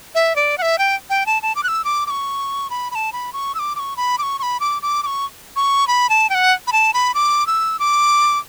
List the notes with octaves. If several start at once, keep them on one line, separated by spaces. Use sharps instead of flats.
E5
D5
F#5
E5
G5
G5
A5
A5
D6
F#6
E6
D6
D6
C#6
B5
B5
A5
B5
C#6
E6
D6
D6
C#6
B5
D6
C#6
C#6
B5
D6
D6
D6
C#6
C#6
B5
A5
G5
F#5
B5
A5
B5
D6
E6
D6